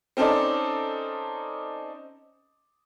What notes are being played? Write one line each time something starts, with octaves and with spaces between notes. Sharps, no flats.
C4 C#4 D#4 A4 D5